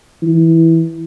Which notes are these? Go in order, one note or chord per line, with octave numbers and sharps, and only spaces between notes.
E3